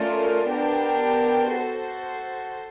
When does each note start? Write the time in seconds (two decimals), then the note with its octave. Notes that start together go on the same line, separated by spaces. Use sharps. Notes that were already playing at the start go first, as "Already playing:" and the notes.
Already playing: A3 C#4 F4 A#4 D5
0.49 B3 D4 G4 A#4
1.52 F#4 A4 C5